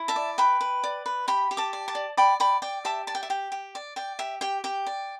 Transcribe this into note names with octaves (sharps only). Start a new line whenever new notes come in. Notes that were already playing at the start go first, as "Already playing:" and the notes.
Already playing: E4
E5 A5
D5
B4 G5 B5
B4
D5
B4
G4 G5 B5
G4
A5 D6
D5
A5 D6
D5
D5 G5 B5
D5 G5 B5
D5 G5
G4 E5 A5
D5 A5
G5
E5
G4 G5
G4
D5
D5 G5
G4 E5
G4 G5
G4 G5
D5